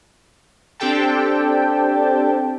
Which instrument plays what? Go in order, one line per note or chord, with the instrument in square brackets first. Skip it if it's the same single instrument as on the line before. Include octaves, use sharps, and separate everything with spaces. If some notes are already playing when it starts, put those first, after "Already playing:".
[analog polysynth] C4 D4 G4 A4 G5 A5